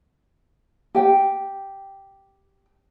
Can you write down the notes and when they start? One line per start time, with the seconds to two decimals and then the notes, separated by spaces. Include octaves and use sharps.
0.95 G4 G5